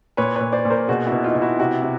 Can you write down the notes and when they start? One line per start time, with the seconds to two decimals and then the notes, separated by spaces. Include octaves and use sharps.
0.17 A#2 B4 C#5
0.36 A#2 B4 C#5
0.52 C5 D5
0.65 A#2
0.70 A#4 C5
0.88 B2 F#4 G#4
1.06 E4 F#4
1.12 B2
1.23 D#4 F4
1.35 B2
1.42 E4 F#4
1.59 C3 E4 F#4
1.82 C3